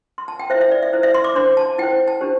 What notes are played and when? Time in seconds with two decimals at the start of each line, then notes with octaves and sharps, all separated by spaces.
0.18 C6
0.28 A5
0.39 G5
0.50 C5 E5
0.54 E4
0.61 E5
0.71 D5
0.83 E5
0.93 E4 C5
1.03 E5
1.14 C6
1.24 D6
1.35 D4 C5 C6
1.57 A5
1.78 E4 C5 G5
2.08 A5
2.21 D4 G4 C5